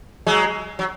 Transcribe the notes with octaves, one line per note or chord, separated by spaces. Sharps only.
F#3 G#3
F#3